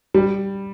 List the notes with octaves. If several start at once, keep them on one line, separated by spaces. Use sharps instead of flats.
G3